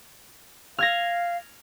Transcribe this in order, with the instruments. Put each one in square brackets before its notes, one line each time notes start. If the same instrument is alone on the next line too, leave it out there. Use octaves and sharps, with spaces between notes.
[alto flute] F5 [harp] F6 G#6 A#6